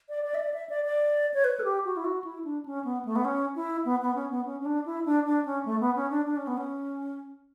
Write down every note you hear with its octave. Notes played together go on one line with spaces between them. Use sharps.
D5
D5
E5
D5
E5
D5
D5
C#5
B4
A4
G4
F#4
E4
F#4
E4
D4
C#4
B3
A3
B3
C#4
E4
B3
B3
C#4
B3
C#4
C#4
D4
E4
D4
D4
C#4
A3
B3
C#4
D4
D4
C#4
B3
C#4